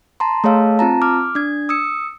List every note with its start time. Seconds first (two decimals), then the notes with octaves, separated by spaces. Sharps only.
0.20 A5 A#5 C6
0.44 A3 G#4 C#5 F5 A5 E6
0.79 C4 F4 A5 A#5
1.02 D6 F6
1.35 D4 G#6
1.69 D#6 E6 C#7